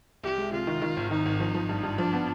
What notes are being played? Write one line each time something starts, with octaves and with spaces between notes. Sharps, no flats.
C2 G4
G#3
C3 F4
D#3
D#3
G#1
D#3 D#4
G#1
F3
F3
G2
G2
F3 D4
B3